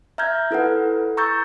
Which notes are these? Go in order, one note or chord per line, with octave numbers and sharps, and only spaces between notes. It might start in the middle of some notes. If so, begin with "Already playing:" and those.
E5 A#5 F6 G6 G#6
E4 A4 B4 F#5
A#5 C#6 E6 G6 A6